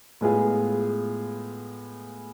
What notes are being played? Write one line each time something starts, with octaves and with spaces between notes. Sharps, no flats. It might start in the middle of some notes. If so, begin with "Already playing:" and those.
A2 G#3 B3 F4 G#4